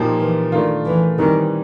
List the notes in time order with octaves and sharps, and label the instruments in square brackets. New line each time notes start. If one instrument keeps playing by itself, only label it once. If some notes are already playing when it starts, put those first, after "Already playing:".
Already playing: [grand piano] A#2 F3 A#3 D#4 G4
[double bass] E3
[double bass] D#3 [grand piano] A3 D4 F4
[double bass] E3
[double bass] D#3 [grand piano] E3 G3 C4 D#4